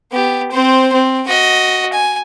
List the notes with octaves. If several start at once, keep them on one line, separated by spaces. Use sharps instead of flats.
B3 G4
C4 C5
C4
F#4 D#5
G#5